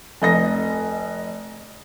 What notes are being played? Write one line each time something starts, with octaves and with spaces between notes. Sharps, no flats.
F1 D#5 A#6